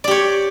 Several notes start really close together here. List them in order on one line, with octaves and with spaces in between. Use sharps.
D5 G4 C#5